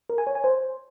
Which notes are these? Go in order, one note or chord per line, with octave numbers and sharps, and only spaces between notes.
A#4
G#5
C#5
G#5
C5